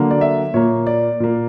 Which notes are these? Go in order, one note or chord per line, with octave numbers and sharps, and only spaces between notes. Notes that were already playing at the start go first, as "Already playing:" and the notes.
Already playing: D3 F#3 A#3
D5
E5
A#2 A#3 C#5
D5
A#2 A#3